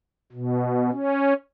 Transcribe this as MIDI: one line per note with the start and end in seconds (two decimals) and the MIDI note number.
0.32 0.91 47
0.92 1.33 61